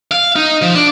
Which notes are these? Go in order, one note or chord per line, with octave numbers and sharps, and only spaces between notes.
F5
D#4
F3
D4